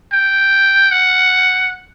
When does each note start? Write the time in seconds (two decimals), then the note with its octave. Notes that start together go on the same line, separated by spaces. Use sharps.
0.13 G5
0.92 F#5